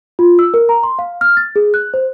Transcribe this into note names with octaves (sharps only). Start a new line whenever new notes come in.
F4
E6
A#4
A#5
C6
F5
F6
A6
G#4
F#6
C5